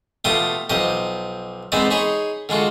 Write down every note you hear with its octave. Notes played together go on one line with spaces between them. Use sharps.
B2 A3 F4 G4 G5 D#6
B1 F3 G4 D#5
G#3 B3 C4 D#4 C5 D5
D#4 G#4 C#5 B5 C6
D3 G#3 F4 F#4